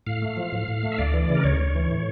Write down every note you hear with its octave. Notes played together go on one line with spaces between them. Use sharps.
A2 F5
A3
F3
A2
A2
A3
E5
D2 D5
E3
C#3
A#4
D2 C#5
D2
E3
A2